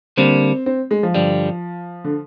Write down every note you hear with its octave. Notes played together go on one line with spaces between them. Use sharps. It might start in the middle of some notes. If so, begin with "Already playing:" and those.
D3 G3 A#3 C4
C4
G#3
F3
G2 D3 G3
D3